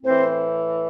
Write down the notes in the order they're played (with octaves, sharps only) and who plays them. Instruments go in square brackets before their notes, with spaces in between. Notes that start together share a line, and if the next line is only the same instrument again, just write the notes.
[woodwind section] A2 E3 C4 C5